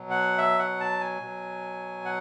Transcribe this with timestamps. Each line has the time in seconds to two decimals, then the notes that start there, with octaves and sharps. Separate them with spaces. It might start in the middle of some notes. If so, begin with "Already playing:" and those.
Already playing: B2 F#3
0.10 F#5
0.38 E5
0.59 F#5
0.80 A5
1.01 G#5
1.22 B2 F#3
2.05 F#5